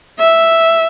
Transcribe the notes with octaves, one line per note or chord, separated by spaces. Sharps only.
E5